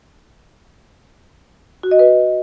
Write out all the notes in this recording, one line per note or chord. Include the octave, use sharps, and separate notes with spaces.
F#4
D#5
B4